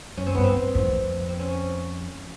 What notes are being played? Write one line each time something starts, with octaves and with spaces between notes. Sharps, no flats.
F#2 C#4
C4
G2 B3
C4
F#2
F2
C4
C#4